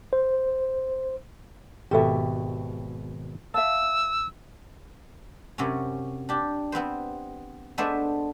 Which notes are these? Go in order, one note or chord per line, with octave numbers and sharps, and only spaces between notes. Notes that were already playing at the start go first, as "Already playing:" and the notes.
C5
G#1 B2 G4 A4 E5
E5 F5 A5 E6
F#2 C3 F#3 C#4
D4 G4
B3 C4 B4 C5
G#3 A3 B3 D4 C5 E5